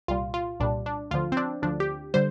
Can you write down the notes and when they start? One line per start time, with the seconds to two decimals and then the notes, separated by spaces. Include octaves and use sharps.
0.08 C2 A#2 G3 F4
0.34 F4
0.60 C2 A#2 G3 D4
0.86 D4
1.11 D2 D3 F3 F4
1.32 C4
1.37 D4
1.62 D2 D3 F3 D4
1.80 G4
2.14 D3 G3 C5